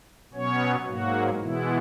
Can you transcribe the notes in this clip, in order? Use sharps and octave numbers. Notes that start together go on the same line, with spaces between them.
B2 F#3 B3 C#4 C#5
G#2 F#3 A#3 F#4
B2 E3 G#3 B3 E4